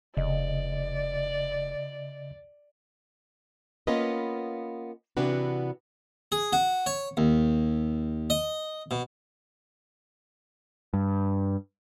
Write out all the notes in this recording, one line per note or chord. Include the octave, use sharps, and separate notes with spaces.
F1 C#3 D5 D#5
A#3 B3 C#4 F4 B4 D#5
C3 E3 B3 D4 F#4 B4
G#4
F#4
C#5
D#2
D#5
B2
G2